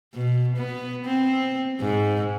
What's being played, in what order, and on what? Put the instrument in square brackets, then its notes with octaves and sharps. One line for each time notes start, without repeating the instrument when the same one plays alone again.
[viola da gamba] B2
B3
C4
G#2